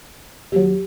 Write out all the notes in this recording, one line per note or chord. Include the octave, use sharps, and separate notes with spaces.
D#2 F#3 G4